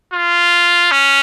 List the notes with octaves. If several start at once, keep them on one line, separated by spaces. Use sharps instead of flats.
F4
C#4